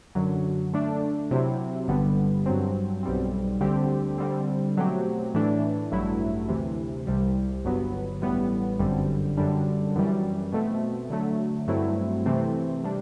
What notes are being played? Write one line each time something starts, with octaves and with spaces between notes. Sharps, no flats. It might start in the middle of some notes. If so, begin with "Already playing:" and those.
F#2 D3 F#3
D3 A3 D4
C3 F#3 C4 E4
G1 G2 D3 G3 B3
G2 F#3 C4
B1 B2 G3 C4
D2 D3 G3 C4 G4
D3 G3 C4
B2 F#3 A3 C4 G4
A2 E3 A3 D4
A1 G2 F#3 A3 E4
D2 C3 E3
C2 C3 G3
G1 G2 F#3 B3
A1 A2 G3 B3
G1 F#2 D3 G3 C4
F#2 D3 G3 D4
F#2 E3 G3
B2 A3 C4
D3 F#3 A3
G2 F#3 A3 C4 E4
C3 E3 A3 C4
C3 G3 D4